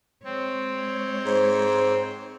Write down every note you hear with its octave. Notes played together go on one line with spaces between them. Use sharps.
G#3 C4 C#5
G#2